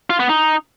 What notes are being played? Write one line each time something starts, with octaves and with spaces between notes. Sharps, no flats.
F4
B3
D#4